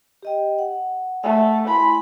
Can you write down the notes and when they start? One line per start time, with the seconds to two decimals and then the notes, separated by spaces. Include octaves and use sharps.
0.23 G4 D#5 G5
0.59 F#5
1.23 A3 E5 F#5 E6
1.68 E4 G#5 B5 C6